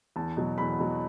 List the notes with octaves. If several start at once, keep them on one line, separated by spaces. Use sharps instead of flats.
E2 A5
B2 F#3
E2 B5
B2 F#3